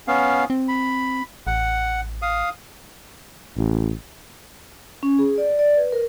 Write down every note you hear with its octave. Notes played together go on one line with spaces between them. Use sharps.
B3 C#4 F5
C4
B5
A1 F#5
F5 D#6
A1
C#4
G#4
D5
D5
B4
A#4